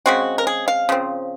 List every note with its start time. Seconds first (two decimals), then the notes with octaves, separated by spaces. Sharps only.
0.06 C#3 G#3 C4 F#4
0.38 A#4
0.47 G#4
0.68 F5
0.89 C#3 F3 C4